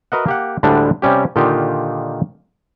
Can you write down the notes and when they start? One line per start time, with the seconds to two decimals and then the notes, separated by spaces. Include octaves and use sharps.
0.12 F#4 A#4 B4 D#5 E5 F#5
0.26 A#3 G4 F#5
0.63 D2 A2 D3 G3 G#3 D4
1.02 C3 G3 C#4 G4
1.36 A#2 D3 D#3 D#4 F4 G4